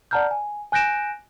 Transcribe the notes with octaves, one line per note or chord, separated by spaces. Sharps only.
D5 F#5 A5 A#5 F6 G6
G#5
G#5 F#6 G6 A#6 D7 E7